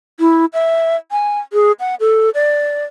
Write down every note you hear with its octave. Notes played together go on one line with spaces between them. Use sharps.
E4
E5
G#5
G#4
F#5
A4
D5